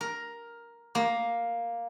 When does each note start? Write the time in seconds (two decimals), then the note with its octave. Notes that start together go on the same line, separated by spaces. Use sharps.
0.01 A#4
0.95 A#3